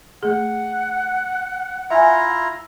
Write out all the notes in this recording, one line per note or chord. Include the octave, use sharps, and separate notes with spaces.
A3 G#4 F#5
E4 F4 E5 G#5 A#5